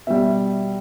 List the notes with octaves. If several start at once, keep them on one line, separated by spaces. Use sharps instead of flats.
B2 G3 E5